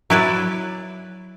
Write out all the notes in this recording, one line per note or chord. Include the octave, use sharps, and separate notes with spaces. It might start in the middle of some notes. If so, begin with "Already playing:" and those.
F#3 E4 B4 D5